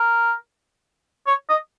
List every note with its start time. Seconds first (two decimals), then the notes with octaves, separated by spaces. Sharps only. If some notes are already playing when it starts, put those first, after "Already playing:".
Already playing: A#4
1.27 C#5
1.49 D#5